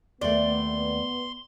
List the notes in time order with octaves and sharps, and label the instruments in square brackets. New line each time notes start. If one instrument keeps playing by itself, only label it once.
[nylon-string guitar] D#2 A3 [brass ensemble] B3 [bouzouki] D5 [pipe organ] C6